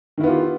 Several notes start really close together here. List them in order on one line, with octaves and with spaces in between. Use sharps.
D#3 E4 B3 F4 G4